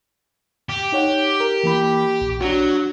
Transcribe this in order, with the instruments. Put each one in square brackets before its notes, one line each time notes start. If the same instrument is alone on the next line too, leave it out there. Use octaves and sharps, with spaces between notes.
[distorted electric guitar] G4
[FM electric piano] D#4 C#5 F#5
A#4
E3 A#3 B5
A#1
[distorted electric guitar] F#3 [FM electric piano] D4 F#4